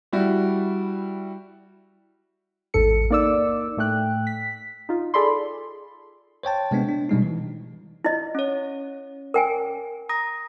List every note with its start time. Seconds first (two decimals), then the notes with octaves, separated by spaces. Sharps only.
0.13 G3 E4 F#4
2.74 A1 E2 G#2 A4 C#7
3.10 A#3 D#4 D5 D6 E6
3.77 A2 A3 G5 F#6
4.27 B6
4.89 D#4 F4
5.14 G#4 A4 D5 B5 C6
6.43 C5 C#5 G5 A5
6.71 C3 G#3 B3 D4
6.89 D4
7.09 B2 G3 G#3 D#4
7.22 E3
8.04 E4 D#5
8.35 C#4 C#5
9.34 A#4 G5 G#5
10.09 A#5 D#6 A#6